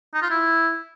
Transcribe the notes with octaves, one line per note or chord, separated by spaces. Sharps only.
D#4
F4
E4